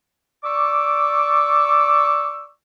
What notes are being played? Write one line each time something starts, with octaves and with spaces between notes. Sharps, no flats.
D5 C#6 D6 E6